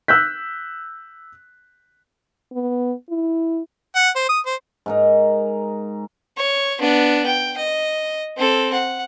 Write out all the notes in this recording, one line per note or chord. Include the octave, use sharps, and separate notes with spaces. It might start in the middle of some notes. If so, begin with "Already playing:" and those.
E6 F#6 G6 B6
B3
E4
F#5
C5
D#6
C5
G#2 D#4 A#4
C#5
B3 D4
G5
D#5
C4 A4
F#5